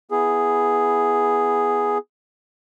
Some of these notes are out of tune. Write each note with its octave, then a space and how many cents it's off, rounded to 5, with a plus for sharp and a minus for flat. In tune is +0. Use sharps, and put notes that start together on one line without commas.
B3 +0 E4 +0 G#4 +0